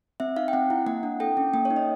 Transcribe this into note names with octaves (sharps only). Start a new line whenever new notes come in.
C4 E5
D#4 F5
G5
C4 F#5
E4
A#3 F#5
D4
A4 G5
C#4
A#3 G5
C#5
D#4
D#5